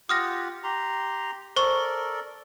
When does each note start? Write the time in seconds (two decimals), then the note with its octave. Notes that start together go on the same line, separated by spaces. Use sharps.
0.09 F4 G4 F#5 D#6 F6 A#6
0.63 G4 A#5 C6
1.56 A4 A#4 C5 D5 C#6